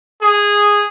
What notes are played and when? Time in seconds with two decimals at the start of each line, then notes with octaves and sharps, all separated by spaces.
0.22 G#4